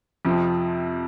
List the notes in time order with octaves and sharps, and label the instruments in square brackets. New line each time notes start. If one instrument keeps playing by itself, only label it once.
[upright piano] F2 C3 F3